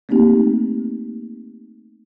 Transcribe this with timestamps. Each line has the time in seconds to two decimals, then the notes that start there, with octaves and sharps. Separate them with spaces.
0.09 A3 A#3 C4 D#4 G4